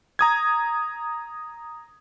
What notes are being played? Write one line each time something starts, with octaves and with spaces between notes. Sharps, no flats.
A#5 D#6 G#6